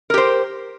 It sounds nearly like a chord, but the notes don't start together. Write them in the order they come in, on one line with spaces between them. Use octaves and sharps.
A#4 G4 C5